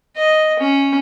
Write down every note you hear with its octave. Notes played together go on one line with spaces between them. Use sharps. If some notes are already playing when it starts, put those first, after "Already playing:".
D#5
C#4